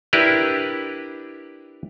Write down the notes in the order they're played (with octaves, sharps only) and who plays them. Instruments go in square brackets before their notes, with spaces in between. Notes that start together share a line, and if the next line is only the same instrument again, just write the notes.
[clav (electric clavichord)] D4 E4 G4 A#4 B4